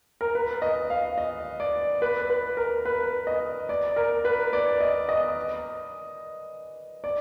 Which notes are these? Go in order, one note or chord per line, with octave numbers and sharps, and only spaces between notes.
A#4
B4
D#5
F5
D#5
D5
B4
B4
A#4
B4
D#5
D5
A#4
B4
D5
D#5
D#5
D5